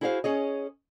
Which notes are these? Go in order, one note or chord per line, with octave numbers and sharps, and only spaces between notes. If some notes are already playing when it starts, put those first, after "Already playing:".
E4 F#4 G#4 C5 D#5 F5
C#4 G#4 C#5 D#5